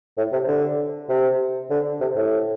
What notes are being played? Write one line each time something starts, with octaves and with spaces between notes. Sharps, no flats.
A2
C3
D3
C3
D3
C3
A2